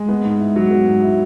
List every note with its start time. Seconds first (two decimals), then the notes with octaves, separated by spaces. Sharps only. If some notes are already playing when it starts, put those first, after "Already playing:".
Already playing: G#3
0.09 B3
0.24 G#2
0.40 E4
0.56 F#3
0.71 B3
0.87 G#2
1.03 E4